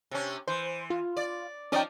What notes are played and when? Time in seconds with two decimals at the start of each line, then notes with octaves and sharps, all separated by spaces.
0.11 C3 C#4
0.48 E3 C5
0.90 F4
1.17 D5
1.72 F3 C#4 D#4 D5 G5